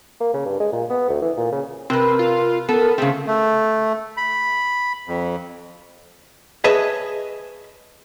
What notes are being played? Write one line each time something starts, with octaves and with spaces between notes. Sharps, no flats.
A#3
C#3
G2
G#3
A#2
B3
D2
E3
A#2
C#3
C3 C4 A#4 B4
F4
B3 A4 A#4
C#3 A3 C4 G#4
A3
B5
F2
G#4 B4 C#5 D#5 E5 A5